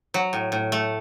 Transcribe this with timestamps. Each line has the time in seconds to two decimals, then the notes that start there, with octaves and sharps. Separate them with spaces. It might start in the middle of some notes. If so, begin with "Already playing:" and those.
0.14 F#3
0.33 A2
0.52 A2
0.72 A3